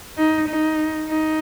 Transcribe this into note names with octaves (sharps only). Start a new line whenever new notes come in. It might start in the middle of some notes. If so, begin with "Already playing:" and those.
D#4
D#4
D#4